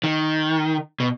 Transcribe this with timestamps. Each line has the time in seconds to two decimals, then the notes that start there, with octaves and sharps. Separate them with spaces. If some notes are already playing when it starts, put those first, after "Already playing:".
0.04 D#3
1.00 B2